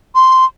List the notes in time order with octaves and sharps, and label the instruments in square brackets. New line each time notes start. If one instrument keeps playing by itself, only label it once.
[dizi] C6